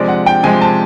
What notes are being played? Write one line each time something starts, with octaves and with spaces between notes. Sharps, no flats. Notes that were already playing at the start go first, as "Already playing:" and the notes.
Already playing: C3 F3 G#3 D5
F#5
G5
C3 F3 G#3 G#5
A5